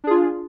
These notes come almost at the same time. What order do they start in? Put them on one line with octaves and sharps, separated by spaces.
D4 G#4 F4